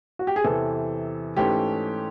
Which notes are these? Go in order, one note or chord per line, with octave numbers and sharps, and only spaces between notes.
F#4
G4
G#4
E2 C3 E3 A4
G#2 E3 A3 C#4 G4